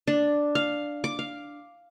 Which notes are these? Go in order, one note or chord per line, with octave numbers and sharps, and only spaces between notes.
D4
F5
D6
F5